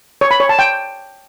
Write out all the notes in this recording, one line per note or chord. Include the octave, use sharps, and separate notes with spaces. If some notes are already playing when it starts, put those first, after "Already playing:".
C#5
B5
C#5
A5
G5